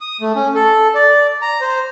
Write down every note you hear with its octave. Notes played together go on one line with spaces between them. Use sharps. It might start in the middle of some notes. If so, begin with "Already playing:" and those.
D#6
A3
C#4
A4
D5
A#5
C5